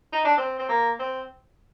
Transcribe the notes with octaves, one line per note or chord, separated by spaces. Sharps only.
D#4
D4
C4
C4
A#3
C4